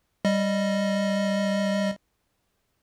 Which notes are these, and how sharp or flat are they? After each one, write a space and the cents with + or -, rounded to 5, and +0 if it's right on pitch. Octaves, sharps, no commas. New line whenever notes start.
G3 +0 D#5 +0